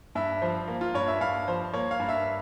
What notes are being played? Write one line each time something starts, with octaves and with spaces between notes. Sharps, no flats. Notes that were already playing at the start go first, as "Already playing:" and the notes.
G2 E5
F3 C5
A#3
F4
G2 C#5
E5
G2 F5
F3 C5
A#3 C#5
F5
G2
E5